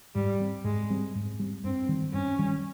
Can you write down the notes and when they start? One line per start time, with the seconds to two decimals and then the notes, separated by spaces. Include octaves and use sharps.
0.15 G#2 G3
0.40 G3 C4
0.64 G#2 G#3
0.90 G3 C4
1.15 G#2
1.40 G3 C4
1.64 G2 C4
1.89 D#3 G3
2.13 G2 C#4
2.39 D#3 G3